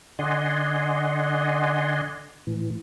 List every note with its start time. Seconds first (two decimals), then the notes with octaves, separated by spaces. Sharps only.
0.19 D3 D5 D#5 F#5 G#5 C6
2.47 A2 E3